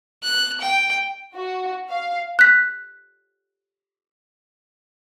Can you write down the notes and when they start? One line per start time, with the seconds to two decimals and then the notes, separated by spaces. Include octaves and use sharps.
0.24 F#6
0.60 G5
1.34 F#4
1.90 F5
2.39 F#6 B6